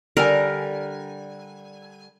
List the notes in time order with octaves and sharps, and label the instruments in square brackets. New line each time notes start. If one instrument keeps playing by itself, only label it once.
[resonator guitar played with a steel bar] D3 G3 G#5 [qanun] A#4